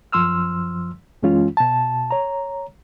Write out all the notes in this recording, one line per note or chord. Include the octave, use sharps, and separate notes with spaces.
F#2 F3 C6 E6 F6
F#2 E3 G#3 C#4 F4
B2 A5
C#5 A#5